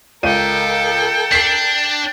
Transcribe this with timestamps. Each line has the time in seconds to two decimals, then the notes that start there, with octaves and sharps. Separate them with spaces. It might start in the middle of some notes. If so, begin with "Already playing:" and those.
0.23 C#2 A4 A#4 G5 D#7
1.32 D4 B6 C7